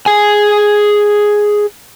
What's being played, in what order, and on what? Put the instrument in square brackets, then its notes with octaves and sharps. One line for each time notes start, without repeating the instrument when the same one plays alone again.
[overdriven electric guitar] G#4 G#5